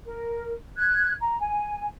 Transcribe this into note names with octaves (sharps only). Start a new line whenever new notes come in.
A#4
F#6 G#6
A#5
G#5